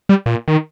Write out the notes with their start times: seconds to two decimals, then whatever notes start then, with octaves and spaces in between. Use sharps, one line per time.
0.09 G3
0.26 A#2
0.48 D#3